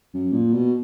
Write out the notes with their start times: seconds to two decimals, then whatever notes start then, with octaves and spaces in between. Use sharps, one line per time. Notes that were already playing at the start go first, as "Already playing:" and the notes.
0.14 F#2
0.33 A#2
0.53 B2